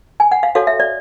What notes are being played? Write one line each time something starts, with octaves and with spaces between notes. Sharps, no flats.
G#5
F#5
F5
F#4 A4 C#5 F5
E5
D5